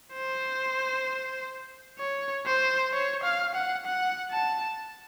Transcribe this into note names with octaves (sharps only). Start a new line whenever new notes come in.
C5
C#5
C5
C#5
F5
F#5
F#5
A5